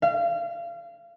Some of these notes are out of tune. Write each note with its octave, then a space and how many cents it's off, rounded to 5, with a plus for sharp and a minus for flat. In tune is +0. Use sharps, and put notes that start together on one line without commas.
F5 -30